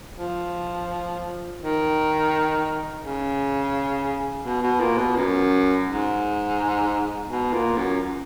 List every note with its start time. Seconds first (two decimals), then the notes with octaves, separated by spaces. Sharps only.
0.17 F3
1.60 D#3
3.02 C#3
4.45 B2
4.62 B2
4.80 A#2
4.97 B2
5.16 F#2
5.87 G#2
7.29 B2
7.53 A#2
7.77 F#2